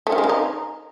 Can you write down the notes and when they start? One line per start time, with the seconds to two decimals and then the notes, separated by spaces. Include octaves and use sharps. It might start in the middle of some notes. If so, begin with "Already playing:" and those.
0.07 A3
0.12 D#3
0.18 G#3
0.24 C#3
0.29 D#4